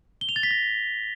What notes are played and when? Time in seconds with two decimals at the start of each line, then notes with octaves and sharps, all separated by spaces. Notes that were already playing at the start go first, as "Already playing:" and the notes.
0.21 G7
0.29 F7
0.36 A6
0.43 B6
0.51 A#6